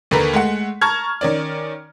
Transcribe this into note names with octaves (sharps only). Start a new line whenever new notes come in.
D#2 D3 A#4 B4 B6
G#3 A3 F#5
A5 A#5 C#6 F6 G#6
D#3 C#4 D5